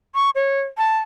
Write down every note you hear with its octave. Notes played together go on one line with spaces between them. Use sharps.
C#6
C#5
A5